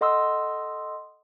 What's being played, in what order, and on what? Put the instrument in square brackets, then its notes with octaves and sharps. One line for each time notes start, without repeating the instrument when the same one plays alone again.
[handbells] A4 D#5 F#5 C6 D#6 E6